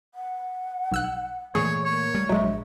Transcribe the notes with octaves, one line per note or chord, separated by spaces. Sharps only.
F#5
B1 E6 F#6
A#2 E3 A3 G#4 C#5
A#3 C#5
G3 A3
A#1 G2 F#3 G#3 E5